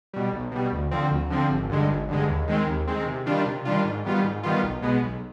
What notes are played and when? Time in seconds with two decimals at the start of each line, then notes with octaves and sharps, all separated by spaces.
0.13 B2 G3
0.33 B1
0.51 B2 G3
0.72 D2
0.91 D3 F3 C4
1.11 D2
1.30 D3 F3 C4
1.50 G#1
1.69 G2 D3 G#3
1.89 G#1
2.08 G2 D3 G#3
2.28 D#2
2.47 D#3 G#3 C4
2.67 D#2
2.87 D#3 G#3 C4
3.06 C3
3.26 D#3 G3 D4 F4
3.46 C3
3.65 D#3 G3 D4 F4
3.84 G#2
4.05 D#3 G3 B3 F4
4.24 G#2
4.43 D#3 G3 B3 F4
4.63 B1
4.82 B2 G#3 B3
5.03 B1